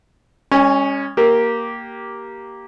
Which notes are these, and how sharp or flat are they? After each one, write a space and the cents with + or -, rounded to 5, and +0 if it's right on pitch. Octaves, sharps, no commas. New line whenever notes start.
G#3 -35 C#4 +0
A#3 +0 G4 -10